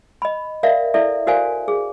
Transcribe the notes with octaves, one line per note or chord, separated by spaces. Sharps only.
D#5 B5
A#4 D5 E5 F5
E4 A4 D5 E5
F#4 A#4 C5 D5 F5 G#5
G#4